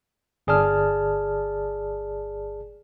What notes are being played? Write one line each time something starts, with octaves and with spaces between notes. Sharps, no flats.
G1 G#4 D5 A5 F6